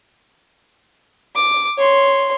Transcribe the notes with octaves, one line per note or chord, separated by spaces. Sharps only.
D6
C#5 C6